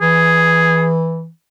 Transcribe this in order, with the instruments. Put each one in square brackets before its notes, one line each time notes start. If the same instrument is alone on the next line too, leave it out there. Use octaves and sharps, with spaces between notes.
[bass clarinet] E3 [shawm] G#4